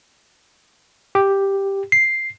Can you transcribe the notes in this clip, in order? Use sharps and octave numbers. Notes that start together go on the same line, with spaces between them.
G4
C7